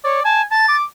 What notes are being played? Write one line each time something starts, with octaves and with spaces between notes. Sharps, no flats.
C#5 D5
G#5 A5
A5 A6
D6